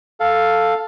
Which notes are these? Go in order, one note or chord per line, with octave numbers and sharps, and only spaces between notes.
A4 F5